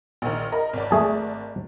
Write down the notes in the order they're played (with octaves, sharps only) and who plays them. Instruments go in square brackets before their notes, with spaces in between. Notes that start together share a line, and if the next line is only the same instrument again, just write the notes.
[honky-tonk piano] A#1 D#3
A#4 D#5 B5
G#1 D5
[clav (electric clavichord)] A3 G#4 A5